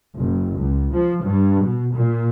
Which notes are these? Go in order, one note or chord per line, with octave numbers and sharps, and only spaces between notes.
F#1
C#2
F3
G2
B2
A#2